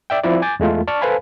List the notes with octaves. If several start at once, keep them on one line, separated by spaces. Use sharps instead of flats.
D5 E5 G5
F3 C4 E4 D5
G#5 D6 G6 A6
E2 G#3 A3 F4
D5 A5 C#6 F6
A4 B4 C5 F5 G#5 B5